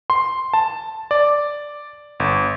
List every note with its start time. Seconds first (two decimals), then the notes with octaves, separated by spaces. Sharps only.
0.10 C6
0.53 A5
1.11 D5
2.20 G1